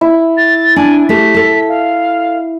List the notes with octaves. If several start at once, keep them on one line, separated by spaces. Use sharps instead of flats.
E4
A6
D4 G#5
A3 G4 B6
A4 A5
F5